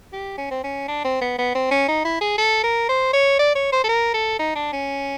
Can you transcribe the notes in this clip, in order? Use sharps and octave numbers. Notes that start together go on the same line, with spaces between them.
G4
C#4
C4
C#4
D4
C4
B3
B3
C4
C#4
D#4
E4
G#4
A4
A#4
C5
C#5
D5
C#5
C5
A4
A#4
A4
D#4
D4
C#4